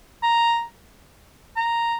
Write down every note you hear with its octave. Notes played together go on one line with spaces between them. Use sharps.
A#5
A#5